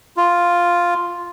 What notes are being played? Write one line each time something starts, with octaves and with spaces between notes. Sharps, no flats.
F4